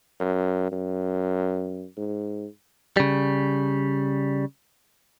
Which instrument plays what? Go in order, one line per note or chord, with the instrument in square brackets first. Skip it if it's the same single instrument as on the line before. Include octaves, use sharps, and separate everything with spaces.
[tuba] F#2
F#2
G#2
[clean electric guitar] C#3 G3